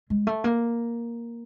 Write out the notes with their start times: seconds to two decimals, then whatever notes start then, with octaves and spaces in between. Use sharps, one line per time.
0.10 G#3
0.27 A3
0.44 A#3